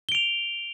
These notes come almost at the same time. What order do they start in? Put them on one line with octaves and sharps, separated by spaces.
G7 D7 F7